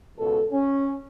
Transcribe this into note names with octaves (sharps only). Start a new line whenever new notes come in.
C#2 B2 A4
C#4